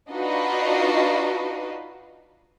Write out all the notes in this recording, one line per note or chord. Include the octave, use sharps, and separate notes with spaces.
D4 D#4 F4 F#4 B4 D#5